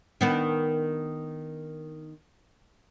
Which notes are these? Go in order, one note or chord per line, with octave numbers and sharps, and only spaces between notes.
D#3 B3 D4